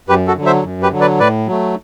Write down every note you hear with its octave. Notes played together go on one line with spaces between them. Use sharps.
F#2 G4 B4
F#4 A4
D3 F#3
C5 E5
F#2
G4 B4
D3 F#3
B4 D5
A2 B4 D5
F#3 A3